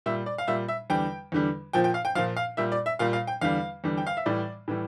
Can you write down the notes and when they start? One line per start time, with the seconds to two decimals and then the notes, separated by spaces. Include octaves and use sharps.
0.06 A#2 G3 E5
0.26 D5
0.38 F5
0.47 A#2 G3 E5
0.68 E5
0.90 E2 D3 G3 G5
1.32 E2 D3 G3
1.73 A#2 F3 G5
1.84 G5
1.94 F5
2.05 G5
2.15 F3 F5
2.18 A#2
2.37 F5
2.57 A#2 G3 E5
2.72 D5
2.86 E5
2.99 A#2 G3 F5
3.13 F5
3.27 G5
3.41 E2 D3 G3 F5
3.84 E2 D3 G3
3.97 G5
4.07 F5
4.17 E5
4.26 A2 E3 G3 D5
4.68 A2 E3 G3